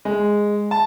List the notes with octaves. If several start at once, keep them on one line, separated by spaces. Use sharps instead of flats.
G#3
A5